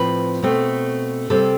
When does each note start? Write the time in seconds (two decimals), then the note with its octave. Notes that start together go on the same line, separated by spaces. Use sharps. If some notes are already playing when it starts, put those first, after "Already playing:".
Already playing: A2 F3 C4 B4
0.42 B2 A3 C4
1.30 C3 G3 C4 A4